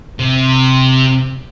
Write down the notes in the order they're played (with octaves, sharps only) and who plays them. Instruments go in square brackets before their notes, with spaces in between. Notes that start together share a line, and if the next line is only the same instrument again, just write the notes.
[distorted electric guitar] C3